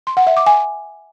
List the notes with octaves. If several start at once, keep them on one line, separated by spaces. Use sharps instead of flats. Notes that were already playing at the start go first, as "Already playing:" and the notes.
C6
F#5
E5
D6
G#5